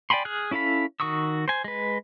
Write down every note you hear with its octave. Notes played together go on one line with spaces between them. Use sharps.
D5 G5 G#5 B5 C6
G#4 F6 F#6
C#4 E4 A4 F5 B5
D#3 F#4 C#6 D#6 E6
C5 G#5
G#3 B4